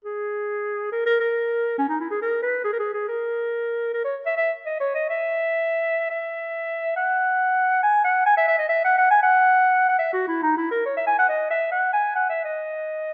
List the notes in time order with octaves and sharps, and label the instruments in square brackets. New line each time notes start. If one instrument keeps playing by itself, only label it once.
[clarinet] G#4
A#4
A#4
A#4
C#4
D#4
E4
G#4
A#4
B4
G#4
A#4
G#4
G#4
A#4
A#4
C#5
E5
E5
D#5
C#5
D#5
E5
E5
F#5
G#5
F#5
G#5
E5
E5
D#5
E5
F#5
F#5
G#5
F#5
F#5
E5
F#4
E4
D#4
E4
A#4
C#5
E5
G#5
F#5
D#5
E5
F#5
G#5
F#5
E5
D#5